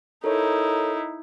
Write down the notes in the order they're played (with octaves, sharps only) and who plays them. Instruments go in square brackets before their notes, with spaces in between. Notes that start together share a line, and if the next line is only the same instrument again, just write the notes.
[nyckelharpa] D#4 E4 [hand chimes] A4 A#4 C#5